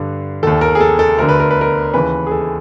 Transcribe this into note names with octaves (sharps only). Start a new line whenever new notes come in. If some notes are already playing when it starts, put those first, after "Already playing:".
Already playing: G2 D3
D#2 D#3 A4
A#4
G#4
A4
A4
D2 D3 A#4
B4
A#4
B4
A#4
D#2 C#3 E3 B4
G#4
A4